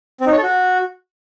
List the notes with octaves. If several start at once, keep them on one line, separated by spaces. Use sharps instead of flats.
C4
D#4
C#5
A4
F#4